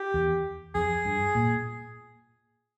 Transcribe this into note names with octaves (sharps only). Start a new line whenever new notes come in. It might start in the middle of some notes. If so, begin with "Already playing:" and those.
Already playing: G4
E2
F2 G#4
G2
A#2